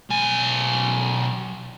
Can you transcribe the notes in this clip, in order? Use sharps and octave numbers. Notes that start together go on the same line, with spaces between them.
B1 G#5